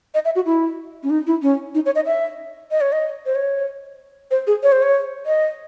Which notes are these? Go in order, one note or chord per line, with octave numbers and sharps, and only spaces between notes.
D#5
E5
F#4
E4
C#4
D#4
E4
C#4
D#4
C#5
D#5
E5
D#5
C#5
D#5
C5
C#5
C5
G#4
C#5
C5
C#5
D#5